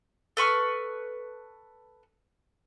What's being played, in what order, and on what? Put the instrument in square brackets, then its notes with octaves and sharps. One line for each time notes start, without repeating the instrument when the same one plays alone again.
[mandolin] A4 B4 C#6 F6